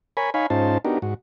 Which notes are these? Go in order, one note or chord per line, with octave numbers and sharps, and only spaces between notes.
A#4 C#5 G#5 B5
D#4 C#5 F5 G#5 B5
G#2 C#4 D#4 F4 C5 A5
B3 D4 D#4 F#4 G4 A#4
G#2 F#4